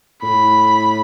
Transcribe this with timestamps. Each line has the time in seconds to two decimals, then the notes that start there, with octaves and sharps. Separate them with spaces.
0.23 A2 B5